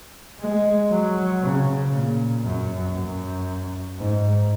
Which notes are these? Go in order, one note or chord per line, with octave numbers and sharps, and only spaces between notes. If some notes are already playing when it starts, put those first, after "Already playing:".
G#3
F#3
C#3
A#2
F#2
F#2
G#2